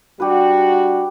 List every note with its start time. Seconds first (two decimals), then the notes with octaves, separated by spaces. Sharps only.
0.20 G3 D4 F#4 G4 B4